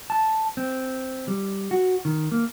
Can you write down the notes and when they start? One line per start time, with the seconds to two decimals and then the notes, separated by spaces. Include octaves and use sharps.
0.10 A5
0.57 C4
1.28 G3
1.71 F#4
2.05 D#3
2.32 A#3